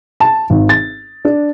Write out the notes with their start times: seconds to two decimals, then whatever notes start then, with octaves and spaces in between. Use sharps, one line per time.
0.20 A5
0.50 G#1
0.69 A6
1.25 D4